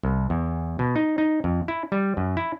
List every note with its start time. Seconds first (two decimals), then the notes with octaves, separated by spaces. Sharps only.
0.03 C2
0.30 E2
0.79 B2
0.96 D#4
1.18 D#4
1.44 F2
1.68 E4
1.92 G3
2.17 F#2
2.37 E4